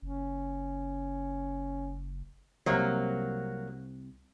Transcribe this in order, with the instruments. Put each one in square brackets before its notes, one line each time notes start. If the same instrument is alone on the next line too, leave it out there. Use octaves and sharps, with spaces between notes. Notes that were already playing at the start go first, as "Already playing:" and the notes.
[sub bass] F#1 [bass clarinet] C#4
[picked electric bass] C2 C3 [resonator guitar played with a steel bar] F#3 A#3